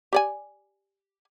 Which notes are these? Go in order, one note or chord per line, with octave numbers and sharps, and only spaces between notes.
G4 D5 G#5